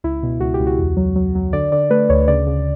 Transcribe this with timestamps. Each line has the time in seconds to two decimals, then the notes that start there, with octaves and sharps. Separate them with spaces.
0.04 C#2 E4
0.23 B2
0.40 C#2 F#4
0.54 G4
0.60 C#2
0.67 F#4
0.79 E2
0.97 F#3
1.16 F#3
1.35 F#3
1.53 D3 D5
1.72 D3 D5
1.90 A3 B4
2.09 D2 C#5
2.28 C#3 D5
2.47 C#3